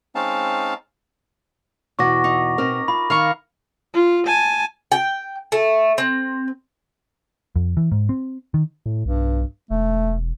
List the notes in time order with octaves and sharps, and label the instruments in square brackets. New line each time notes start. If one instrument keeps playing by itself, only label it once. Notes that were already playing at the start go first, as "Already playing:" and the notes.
[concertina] G#3 C4 C#4 D#4 F5 A5
[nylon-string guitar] E2 B2 F#4 [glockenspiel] C#6 D6 A#6
[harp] D#4
[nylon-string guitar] B2 C4 [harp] A#4
[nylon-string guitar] F4 [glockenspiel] B5
[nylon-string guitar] D#3 [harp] F5 A#5 C#6
[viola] F4
G#5 A5
[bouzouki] G5
A3
C4
[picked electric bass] F2
E3
G#2
C4
D#3
[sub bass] A2
[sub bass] B1 [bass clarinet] G2
[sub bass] E1 [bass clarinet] A3